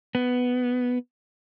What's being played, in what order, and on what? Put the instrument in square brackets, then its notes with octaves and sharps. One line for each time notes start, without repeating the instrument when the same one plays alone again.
[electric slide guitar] B3